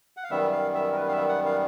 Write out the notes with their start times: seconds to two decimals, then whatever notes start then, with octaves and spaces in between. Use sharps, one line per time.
0.17 F#5
0.24 F5
0.30 F#2 D#3 G3 B3 E5
0.52 F5
0.74 E5
0.92 A#4
0.96 B4
1.08 F5
1.12 E5
1.29 F#5
1.46 F5